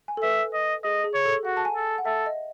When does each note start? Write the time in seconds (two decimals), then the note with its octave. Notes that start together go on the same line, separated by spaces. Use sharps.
0.08 G#5
0.17 A4
0.23 B4 E5
0.53 D#5
0.84 G#4 D#5
1.04 G#4
1.14 C#5
1.25 A4
1.45 F#4 F#5
1.57 A5
1.65 G#5
1.76 A4
1.98 F#5
2.05 A4 E5
2.26 D#5